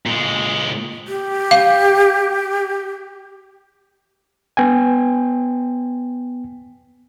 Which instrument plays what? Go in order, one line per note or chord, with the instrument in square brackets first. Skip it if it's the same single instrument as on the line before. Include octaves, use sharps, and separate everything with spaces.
[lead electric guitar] A#2 G#3
[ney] G4
[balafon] F5
[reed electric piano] B3 G5 G#5